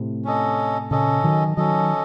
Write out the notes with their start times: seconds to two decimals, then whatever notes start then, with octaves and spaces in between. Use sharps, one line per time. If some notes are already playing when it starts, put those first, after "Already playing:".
Already playing: A2 C3
0.25 C#4 A4 D#5
0.91 A#2 C#3 C#4 A4 D#5
1.24 D#3 F#3
1.57 D#3 F#3 C#4 A4 D#5